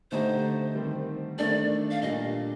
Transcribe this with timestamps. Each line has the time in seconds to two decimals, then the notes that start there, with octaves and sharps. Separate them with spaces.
0.11 D3 A3 D#4 G4 C5
0.75 D#3 G3 C4 G4
1.38 D#3 A3 D4 A4 D5
1.91 F5
2.02 A#2 G3 D4 D#5